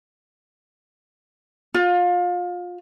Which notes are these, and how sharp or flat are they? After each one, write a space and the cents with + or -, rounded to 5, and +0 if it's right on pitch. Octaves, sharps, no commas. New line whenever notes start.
F4 +25